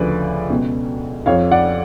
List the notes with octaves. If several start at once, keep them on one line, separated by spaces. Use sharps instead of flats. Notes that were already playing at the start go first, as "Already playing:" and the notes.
Already playing: D2 C#3 F3 B4 D5
C#2 B2
F2 F3 C#5 F5
D5 F#5